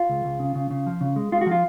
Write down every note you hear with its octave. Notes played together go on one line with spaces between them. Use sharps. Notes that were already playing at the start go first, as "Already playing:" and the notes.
Already playing: F4
C#2
C#2
C#3
C#3
C#3
F3
C#3
G#3
G#3 F4
F#4
F3 F4